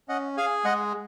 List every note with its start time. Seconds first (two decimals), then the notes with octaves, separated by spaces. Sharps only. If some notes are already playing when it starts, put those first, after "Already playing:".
0.08 C#4 D#5 F#5
0.37 G#4 F5 G#5
0.65 G#3 D#5 F#5